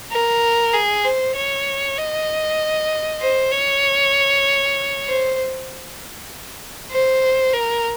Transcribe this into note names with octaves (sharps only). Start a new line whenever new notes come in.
A#4
G#4
C5
C#5
D#5
C5
C#5
C5
C5
A#4